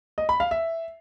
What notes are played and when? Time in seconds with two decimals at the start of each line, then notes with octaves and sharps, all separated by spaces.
0.18 D#5
0.29 B5
0.40 F5
0.51 E5